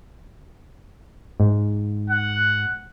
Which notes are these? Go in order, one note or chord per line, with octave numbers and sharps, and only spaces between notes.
G#2
F#5